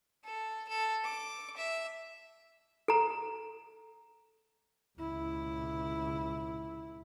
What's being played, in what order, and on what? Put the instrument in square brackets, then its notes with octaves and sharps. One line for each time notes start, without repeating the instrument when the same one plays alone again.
[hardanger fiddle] A4
A4
D6
E5
[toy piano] A4 A#5
[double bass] C#2 E4